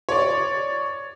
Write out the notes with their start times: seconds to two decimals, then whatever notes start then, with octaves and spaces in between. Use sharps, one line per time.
0.09 C#5 D5